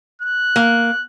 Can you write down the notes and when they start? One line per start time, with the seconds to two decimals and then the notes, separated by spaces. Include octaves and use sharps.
0.21 F#6
0.56 A#3